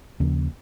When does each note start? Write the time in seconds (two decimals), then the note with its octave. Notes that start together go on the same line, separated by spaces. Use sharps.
0.20 D#2 C#3 F3 A#3